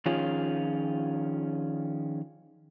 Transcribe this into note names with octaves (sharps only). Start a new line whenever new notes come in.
D#3 F3 C#4 F4 G#4